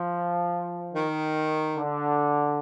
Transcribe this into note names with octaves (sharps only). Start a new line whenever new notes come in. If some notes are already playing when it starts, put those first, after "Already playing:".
Already playing: F3
D#3
D3